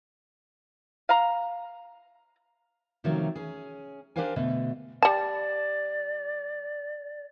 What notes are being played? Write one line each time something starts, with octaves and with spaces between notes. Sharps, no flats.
F5 A#5
C3 D#3 F3 F#3 A3 C#4
C#4 G#4
D4 G4 A#4 C5 F5 G#5
B2 D3 A3
G3 D5 A5